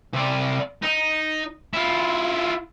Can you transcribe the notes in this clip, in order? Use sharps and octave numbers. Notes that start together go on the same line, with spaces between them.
C3 D5
D#4
E4 F4